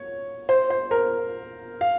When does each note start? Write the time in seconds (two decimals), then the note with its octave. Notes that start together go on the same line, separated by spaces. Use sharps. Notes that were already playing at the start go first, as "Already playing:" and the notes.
Already playing: C#5
0.49 C5
0.70 C5
0.91 A#4
1.81 F5